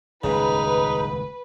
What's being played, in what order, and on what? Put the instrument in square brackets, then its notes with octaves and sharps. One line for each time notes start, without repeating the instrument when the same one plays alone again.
[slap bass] D#1 C#2 G#2 [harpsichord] C#3 [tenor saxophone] D#4 [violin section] B4